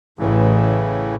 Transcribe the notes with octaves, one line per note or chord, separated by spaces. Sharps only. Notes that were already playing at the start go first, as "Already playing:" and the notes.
A1 A2 C#3 E3